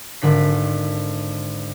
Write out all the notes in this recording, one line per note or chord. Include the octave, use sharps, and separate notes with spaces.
G#1 D3 D4 B6